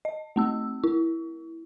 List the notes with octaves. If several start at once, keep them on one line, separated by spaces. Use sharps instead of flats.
D#5
A3 C4 E6
E4